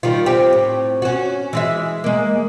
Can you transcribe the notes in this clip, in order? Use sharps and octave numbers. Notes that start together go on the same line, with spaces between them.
D#3 G3 F4
C4 G4
A2
C#4 F#4
E3 G#3 E5
G#3 A#3